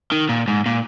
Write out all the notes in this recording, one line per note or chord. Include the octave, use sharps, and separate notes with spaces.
D#3
A#2
G#2
A#2